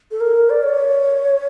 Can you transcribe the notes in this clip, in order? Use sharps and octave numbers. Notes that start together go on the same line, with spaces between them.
A4
A#4
D5
C#5